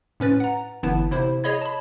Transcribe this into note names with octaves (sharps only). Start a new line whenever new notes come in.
A2 C#4 B4 A6
F#5 A#5
G1 E3 B3 E4 A5
C3 E4 C5
G#4 C#5 D#5 B5 G#6
A5 B5